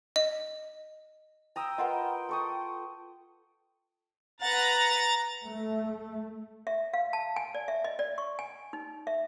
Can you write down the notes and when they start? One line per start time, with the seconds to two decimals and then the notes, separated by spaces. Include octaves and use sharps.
0.16 D#5
1.56 G5 A#5 D#6 E6
1.78 F4 A#4 B4 D#5 F#5
2.29 A4 C#6 D#6
4.40 B4 F#5 A#5 A6
5.46 A3
6.67 E5
6.93 F5
7.13 A5
7.36 G#5
7.55 D5
7.68 E5
7.84 D#5
7.99 D5
8.18 C#6
8.39 G#5
8.73 D#4
9.07 E5